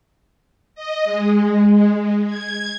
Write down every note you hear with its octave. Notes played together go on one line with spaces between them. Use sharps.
D#5
G#3
G#6